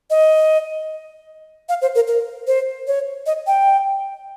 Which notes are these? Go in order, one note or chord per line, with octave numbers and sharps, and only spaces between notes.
D#5
F5
C5
A#4
A#4
C5
C#5
D#5
G5